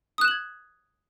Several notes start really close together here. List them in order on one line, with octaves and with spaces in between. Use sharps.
D#6 F#6 E7 F#7 G#6